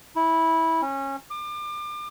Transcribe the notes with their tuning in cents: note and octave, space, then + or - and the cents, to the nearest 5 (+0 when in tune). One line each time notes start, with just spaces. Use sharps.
E4 -15
C#4 -20
D6 +35